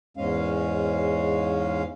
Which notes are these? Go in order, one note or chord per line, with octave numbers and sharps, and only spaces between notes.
E2 G#2 G#3 C#4 F5